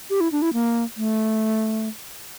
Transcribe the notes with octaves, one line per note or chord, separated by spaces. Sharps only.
G4
E4
D4
E4
A#3
A3